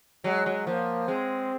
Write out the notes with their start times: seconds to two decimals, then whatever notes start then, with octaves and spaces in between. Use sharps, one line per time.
0.24 F#3 G#3
0.46 F#3
0.67 F3 A#3
1.08 G#3 C4